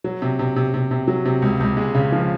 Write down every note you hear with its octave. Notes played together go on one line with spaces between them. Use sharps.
F#3
C3
C3
C3
C3
C3
F#3
C3
C#2
C#2
G#3
C#3
F3